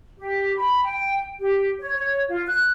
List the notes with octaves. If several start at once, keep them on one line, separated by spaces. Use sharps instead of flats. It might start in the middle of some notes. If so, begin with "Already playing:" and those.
G4
B5
G5
G4
C#5
C#5
F4
F#6